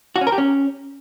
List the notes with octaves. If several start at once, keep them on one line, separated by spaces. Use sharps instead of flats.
F#4
C#4
A#4
G4
C#4